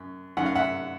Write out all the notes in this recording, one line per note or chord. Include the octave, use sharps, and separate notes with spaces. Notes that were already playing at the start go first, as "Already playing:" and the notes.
Already playing: F#2
F#2 D#3 F#5
F5
E5 F#5